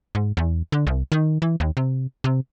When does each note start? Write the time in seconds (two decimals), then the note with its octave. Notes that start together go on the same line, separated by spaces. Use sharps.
0.15 G#2
0.37 E2
0.72 D3
0.87 C2
1.12 D#3
1.42 E3
1.60 D#2
1.77 C3
2.24 C3